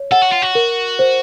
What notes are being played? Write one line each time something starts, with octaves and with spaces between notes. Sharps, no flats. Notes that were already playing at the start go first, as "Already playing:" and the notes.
Already playing: C#5
A4 F#5
F#4
F4
F#4
A#4
C5